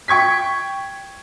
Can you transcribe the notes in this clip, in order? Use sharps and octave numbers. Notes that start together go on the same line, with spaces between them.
G5 C#6 G#6 B6